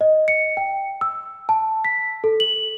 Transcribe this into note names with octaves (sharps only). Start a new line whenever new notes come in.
D#5
C#7
G5
E6
A5
B6
A4
F#7